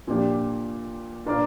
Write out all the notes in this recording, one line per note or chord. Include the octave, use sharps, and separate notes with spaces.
A#2 F3 D4 G4
A#2 A#3 D4 A#4 D5